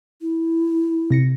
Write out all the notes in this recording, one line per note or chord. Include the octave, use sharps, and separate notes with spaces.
E4
C3 A#6 C#7